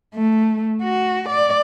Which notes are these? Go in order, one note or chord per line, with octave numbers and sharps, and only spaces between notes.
A3
F#4
D5